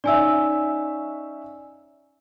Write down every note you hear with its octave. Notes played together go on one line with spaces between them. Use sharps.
C#4 D#4 D5 E5 G#5 E6